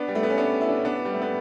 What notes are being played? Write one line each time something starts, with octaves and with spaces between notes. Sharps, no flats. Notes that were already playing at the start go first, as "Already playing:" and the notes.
Already playing: B3 D4
G3
A3
B3
C#4
B3 D4
E4
D4
C#4
B3 D4
G3
A3
B3